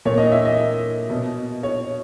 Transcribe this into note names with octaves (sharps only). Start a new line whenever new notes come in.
A#2 C#5
D#5
E5
D#5
B2
C#5